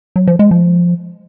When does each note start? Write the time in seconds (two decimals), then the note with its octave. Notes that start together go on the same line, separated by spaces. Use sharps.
0.16 F#3
0.27 F3
0.39 G#3
0.51 F3